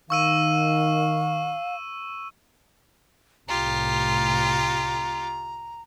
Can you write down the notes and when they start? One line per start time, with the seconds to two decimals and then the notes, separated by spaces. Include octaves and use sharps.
0.10 D#3 F5 C#6 E6 D#7
3.48 C2 A2 F4 G4 A#5